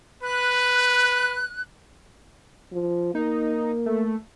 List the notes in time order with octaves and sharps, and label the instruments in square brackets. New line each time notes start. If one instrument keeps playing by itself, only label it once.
[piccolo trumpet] B4 [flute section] F#6
[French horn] F3
[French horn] A#3 [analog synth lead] D#4
[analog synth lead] A3